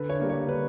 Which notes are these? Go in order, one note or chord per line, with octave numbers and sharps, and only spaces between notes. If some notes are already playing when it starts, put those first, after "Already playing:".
Already playing: D3 B4
C#5
G3 A#3 D4
C#5
D3 B4